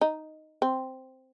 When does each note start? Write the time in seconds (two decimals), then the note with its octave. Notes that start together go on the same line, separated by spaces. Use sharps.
0.01 D#4
0.62 C4